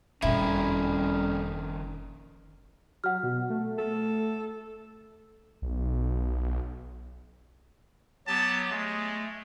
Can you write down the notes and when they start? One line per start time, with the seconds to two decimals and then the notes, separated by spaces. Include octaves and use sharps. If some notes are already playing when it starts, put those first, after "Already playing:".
0.22 F#1 F2 A#2 D#3 F3 G3 C#4 E4
3.04 F#3 F#5 F6
3.23 B2
3.50 A3
3.78 A4
5.62 B1
8.27 F#3 B3 G4 A5
8.71 G#3 A3